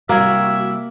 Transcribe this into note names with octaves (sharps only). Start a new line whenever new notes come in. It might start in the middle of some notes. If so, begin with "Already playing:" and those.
C2 G3 A#3 F#4 E5 G#6